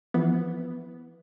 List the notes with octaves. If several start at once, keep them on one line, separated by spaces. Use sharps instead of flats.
E3 F3 B3